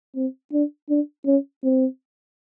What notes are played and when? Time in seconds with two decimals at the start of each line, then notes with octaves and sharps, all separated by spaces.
0.16 C4
0.53 D4
0.89 D4
1.26 C#4
1.64 C4